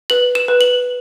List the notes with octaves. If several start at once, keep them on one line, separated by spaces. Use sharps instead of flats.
B4 F#7
E7
B4
F#7